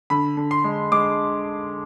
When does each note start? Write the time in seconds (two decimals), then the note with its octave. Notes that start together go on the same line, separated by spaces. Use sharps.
0.10 D3 B5
0.37 D3
0.51 C6
0.64 G#3
0.92 G#3 D6